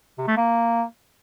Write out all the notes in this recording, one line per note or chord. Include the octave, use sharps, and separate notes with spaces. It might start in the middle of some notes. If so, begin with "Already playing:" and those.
C3
A3
A#3